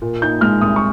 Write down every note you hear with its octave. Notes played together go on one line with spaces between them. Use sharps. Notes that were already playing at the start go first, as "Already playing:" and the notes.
A#2
D#4 G6
G#3 F6
C2 D#6
C#6